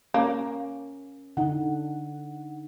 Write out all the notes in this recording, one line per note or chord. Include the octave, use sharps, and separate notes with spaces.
A#3 C#4
D3 D#4 F#5